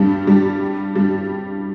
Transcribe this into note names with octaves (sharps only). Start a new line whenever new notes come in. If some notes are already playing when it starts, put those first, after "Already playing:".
Already playing: G2 G3
G2 G3
G2 G3